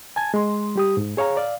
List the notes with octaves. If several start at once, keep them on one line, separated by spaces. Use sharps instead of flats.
G#5 A5 G#6
G#3 C6
G3 G4 D#6
G#2
G#4 C#5 F5 A#5
D5 F5